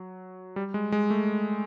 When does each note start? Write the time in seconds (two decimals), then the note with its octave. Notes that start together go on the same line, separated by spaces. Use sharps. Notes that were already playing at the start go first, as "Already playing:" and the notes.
Already playing: F#3
0.56 G3
0.74 G#3
0.92 G#3
1.10 A3